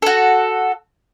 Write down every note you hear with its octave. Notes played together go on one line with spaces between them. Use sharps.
F#4 A4